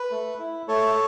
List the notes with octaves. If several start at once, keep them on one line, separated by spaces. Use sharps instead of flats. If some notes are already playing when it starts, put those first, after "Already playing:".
Already playing: B4
A3
E4
A3 A4 C#5